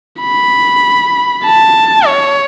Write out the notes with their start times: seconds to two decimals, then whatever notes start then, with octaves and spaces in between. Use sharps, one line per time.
0.21 B5
1.45 A5
2.06 C#5